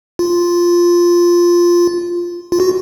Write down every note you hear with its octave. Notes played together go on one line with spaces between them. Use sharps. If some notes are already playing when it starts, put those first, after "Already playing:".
F4
F4
F#4